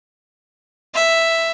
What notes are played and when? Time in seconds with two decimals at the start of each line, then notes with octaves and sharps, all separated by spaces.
0.94 E5